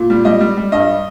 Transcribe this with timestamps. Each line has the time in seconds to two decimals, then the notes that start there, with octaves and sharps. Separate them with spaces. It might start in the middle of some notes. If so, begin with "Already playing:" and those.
Already playing: A#2
0.10 G3
0.25 G3 D#5
0.40 G3
0.57 G3
0.72 G2 D#5